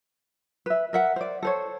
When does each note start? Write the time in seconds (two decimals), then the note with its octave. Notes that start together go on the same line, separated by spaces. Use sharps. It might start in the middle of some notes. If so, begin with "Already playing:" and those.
0.66 B4 E5
0.93 A#4 E5 F#5
1.16 C5 D5
1.43 A4 C5 C#5